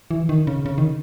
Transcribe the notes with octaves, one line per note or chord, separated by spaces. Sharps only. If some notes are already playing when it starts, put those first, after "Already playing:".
E3
D#3
C#3
C#3
D#3